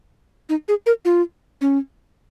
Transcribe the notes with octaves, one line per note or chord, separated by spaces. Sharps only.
D#4
G#4
A#4
F4
C#4